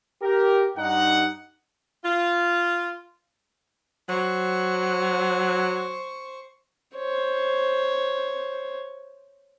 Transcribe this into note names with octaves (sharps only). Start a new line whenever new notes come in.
G4 A#4
G2 D#4 F#5
F4
F#3 C5 C#6
C5 C#5